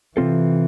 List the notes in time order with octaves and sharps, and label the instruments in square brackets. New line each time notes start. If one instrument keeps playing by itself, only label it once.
[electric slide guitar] C3 F3 C4 F4 A4 [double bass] E3